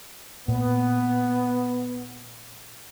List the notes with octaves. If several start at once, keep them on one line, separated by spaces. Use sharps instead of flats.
A#2 B3